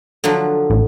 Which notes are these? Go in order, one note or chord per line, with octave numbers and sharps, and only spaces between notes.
D3 F3 F#3
A1